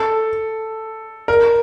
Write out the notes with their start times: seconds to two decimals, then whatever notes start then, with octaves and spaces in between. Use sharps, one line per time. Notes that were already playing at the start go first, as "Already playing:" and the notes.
Already playing: A4
1.28 A#4